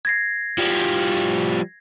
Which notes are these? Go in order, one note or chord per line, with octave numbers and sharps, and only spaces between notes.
G#6 A#6 C7
F3 G3